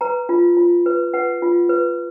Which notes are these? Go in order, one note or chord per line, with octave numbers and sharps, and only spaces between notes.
B4 A#5
F4
F4
B4
B4 F#5
F4
B4